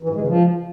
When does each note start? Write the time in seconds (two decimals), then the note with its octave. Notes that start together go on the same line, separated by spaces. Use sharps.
0.03 E3
0.09 G#2
0.15 G#3
0.21 C#3
0.27 F3